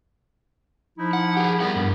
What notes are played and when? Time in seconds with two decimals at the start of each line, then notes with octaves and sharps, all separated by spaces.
0.98 F3 D#4 E4
1.13 F#5
1.37 G4 G#4
1.60 G3 B3 A#4 F#5
1.76 G2